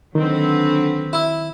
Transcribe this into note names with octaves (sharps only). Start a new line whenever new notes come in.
D3 D#3 F#3 C4 B4
E4